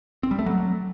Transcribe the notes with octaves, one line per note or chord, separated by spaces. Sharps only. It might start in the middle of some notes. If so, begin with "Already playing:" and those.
C4
G3
A3
F#3